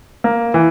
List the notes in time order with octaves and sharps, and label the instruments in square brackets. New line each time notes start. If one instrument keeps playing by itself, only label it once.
[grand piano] A#3
E3